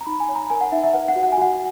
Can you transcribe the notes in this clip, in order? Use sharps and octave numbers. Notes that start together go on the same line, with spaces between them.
A#5
D#4 B5
G#5
C#5
A#5
A#4 G#5
F#5
D#4 E5
E5
B4 F#5
F#5
F#4
F#5
G#5
F#4 F#5